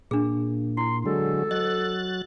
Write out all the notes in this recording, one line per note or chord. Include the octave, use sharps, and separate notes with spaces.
A#2 D4 G#4
E4 C6
D3 F#3 G#3 A4
F#3 D#5 F#6 A6